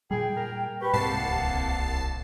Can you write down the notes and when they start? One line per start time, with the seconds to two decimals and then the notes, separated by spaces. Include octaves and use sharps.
0.11 A#2 G3 G#4 G5
0.37 A#4
0.82 G4 B4 C#6
0.93 C2 G#2 A#3 F#5 A5 C7
1.26 D1